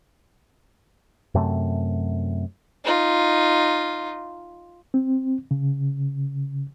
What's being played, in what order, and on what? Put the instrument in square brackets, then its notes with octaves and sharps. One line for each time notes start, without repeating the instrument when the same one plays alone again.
[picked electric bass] F#2 C3 A3
[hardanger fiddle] D#4 F4
[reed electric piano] C4
C#3